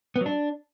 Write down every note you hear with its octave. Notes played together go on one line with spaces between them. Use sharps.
B3
F#3
D4